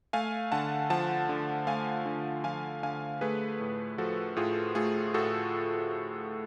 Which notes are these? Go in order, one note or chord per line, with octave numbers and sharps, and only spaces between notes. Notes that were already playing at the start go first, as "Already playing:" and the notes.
A3 F5 G#5
D3 F#5 A5
F3 F#5 A5
D3
A3 F5 G#5
D3
F3 F5 G#5
D3 F5 G#5
A3 G#4 B4
A2
F3 F#4 A4
A2 F4 G#4
A3 F4 G#4
A2 F#4 A4